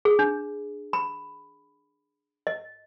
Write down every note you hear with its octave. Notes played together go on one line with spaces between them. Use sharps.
G#4
D4
B5
D#5